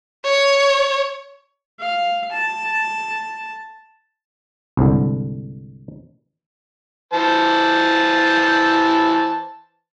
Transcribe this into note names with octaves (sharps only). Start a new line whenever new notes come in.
C#5
F5
A5
C2 G#2 D3
E3 C5 A5